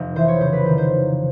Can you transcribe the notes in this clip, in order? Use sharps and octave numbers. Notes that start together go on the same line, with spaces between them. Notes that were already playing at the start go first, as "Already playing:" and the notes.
Already playing: F1
E3 C5
C#5
C#3 C5
B4
D#3 C5
C5